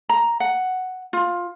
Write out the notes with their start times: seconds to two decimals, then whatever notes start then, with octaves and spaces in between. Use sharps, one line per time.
0.09 A#5
0.40 F#5
1.13 F4